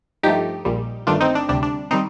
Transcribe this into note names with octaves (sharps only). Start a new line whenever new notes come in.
G2 F3 A3 D#4 G4
A#1 A#2 G3
G1 G2 D#3 A3 D4 F4
C4 D#4
D4
D2 C3 G3 D4
D4
D#3 G3 C4 D#4